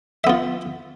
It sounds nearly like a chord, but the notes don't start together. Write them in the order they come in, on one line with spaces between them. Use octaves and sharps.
E5 B3 F4